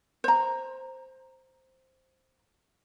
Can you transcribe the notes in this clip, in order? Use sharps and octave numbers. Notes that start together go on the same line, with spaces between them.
C5 A#5